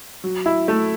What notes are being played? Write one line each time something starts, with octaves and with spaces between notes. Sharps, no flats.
F#3
E4
A3